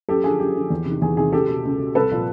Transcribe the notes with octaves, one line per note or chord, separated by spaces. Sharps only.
F#2 G4 A4
D3 F3 G#4
F#2 G4
D3 F3
E2
C3 D#3
E2 G#4
C3 D#3 G#4
C#2 G4 A4
B2
C#2
B2
C2 A4 B4
A#2 F3